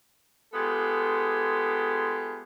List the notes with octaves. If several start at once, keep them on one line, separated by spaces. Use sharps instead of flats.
G#3 B3 F4 G4 A4